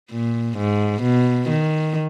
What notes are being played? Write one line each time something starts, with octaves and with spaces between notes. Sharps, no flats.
A#2
G#2
B2
D#3